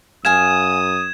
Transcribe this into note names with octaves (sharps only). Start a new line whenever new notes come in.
F#2 F5 G#5 D#6 G#6 E7